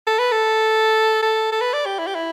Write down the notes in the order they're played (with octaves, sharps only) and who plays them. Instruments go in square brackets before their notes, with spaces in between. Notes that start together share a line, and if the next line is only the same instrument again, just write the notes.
[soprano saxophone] A4
B4
A4
A4
A4
B4
D5
G4
E4
G4
E4